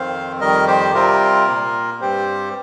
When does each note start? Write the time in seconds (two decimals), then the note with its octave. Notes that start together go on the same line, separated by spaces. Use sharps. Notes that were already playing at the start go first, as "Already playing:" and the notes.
Already playing: F2 D#3 C4 C5 F5
0.40 F2 D#3 G3 A#4 D#5
0.67 G4 C5
0.94 C3 G3 C4 F4 A#4
1.47 A#2 A#3
2.01 G2 G3 C4 G4 C5